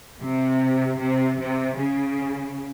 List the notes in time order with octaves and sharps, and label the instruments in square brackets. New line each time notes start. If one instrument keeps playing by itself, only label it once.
[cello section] C3
C3
C3
C#3